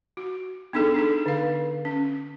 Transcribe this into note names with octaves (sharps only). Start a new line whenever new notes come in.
F#4
B3 D4 D#4 G#4 A4
D4 D#4 A4
D3 F5
C#4